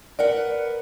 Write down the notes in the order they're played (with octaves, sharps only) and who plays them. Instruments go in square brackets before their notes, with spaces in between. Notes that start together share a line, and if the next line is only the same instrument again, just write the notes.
[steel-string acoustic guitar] A#4 B4 F#5 [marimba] D5